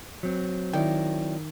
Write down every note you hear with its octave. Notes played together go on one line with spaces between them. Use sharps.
F#3 C4
D#3 E4 D5 G5